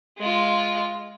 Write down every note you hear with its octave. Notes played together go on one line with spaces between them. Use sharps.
G#3 F4